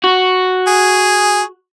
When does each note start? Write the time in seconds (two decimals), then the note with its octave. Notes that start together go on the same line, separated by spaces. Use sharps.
0.04 F#4
0.67 G#4